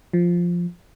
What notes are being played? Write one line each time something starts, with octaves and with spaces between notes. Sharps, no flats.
F3